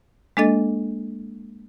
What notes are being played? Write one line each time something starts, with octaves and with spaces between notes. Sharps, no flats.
G#3 A#3 D4 A4 D#5 A6